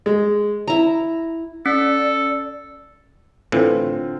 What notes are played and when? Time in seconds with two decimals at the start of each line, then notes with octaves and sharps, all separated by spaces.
0.06 G#3
0.68 E4 A#5
1.66 C#4 A4 D5
3.52 A2 D3 E3 C4 F4